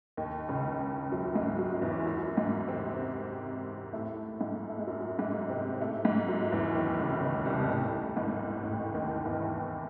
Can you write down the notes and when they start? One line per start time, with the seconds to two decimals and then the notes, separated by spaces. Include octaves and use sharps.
0.17 D#2 D#3
0.49 C#2 C#3
1.12 F#2 F#3
1.35 G#2 G#3
1.59 F#2 F#3
1.82 E2 E3
2.05 F#2 F#3
2.37 G#2 G#3
2.68 C3 C4
3.93 A2 A3
4.40 G#2 G#3
4.69 A3
4.79 G#3
4.87 F#2 F#3
5.19 G#2 G#3
5.50 C3 C4
5.81 A2 A3
6.05 G#2 G#3
6.28 F#2 F#3
6.52 E2 E3
6.75 D#2 D#3
6.99 C#2 C#3
7.16 C#3
7.22 D#2 D#3
7.45 C2 C3
7.69 A1 A2
8.16 G#1 G#2
8.63 A1 A2
8.94 D#2 D#3
9.26 E2 E3